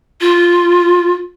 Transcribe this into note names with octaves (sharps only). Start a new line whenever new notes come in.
F4